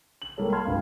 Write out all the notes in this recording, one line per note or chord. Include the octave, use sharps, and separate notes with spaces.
F#7
G3 A#3 G4 A4 C#5
A5 B5 C6 F6 G#6
C#2 G2 C4 F5